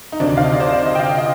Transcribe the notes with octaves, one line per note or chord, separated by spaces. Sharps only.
D#4
D2 C3 D#3 D4
F5
D#5
D5
C5
D5
D#5
G5
F5
D#5